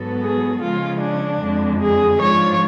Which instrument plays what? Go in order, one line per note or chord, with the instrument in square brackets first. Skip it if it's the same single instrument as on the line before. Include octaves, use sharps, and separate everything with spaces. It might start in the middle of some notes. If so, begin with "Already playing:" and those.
Already playing: [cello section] G#2 F#3 B3 F#4 A4
[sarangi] G#4
[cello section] C#3 F3 G#3 C#4 [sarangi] F4
[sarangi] D4
[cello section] F2 D3 G#3
[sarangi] G#4
[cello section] G#2 F3 G#3 D4 F4 [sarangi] C#5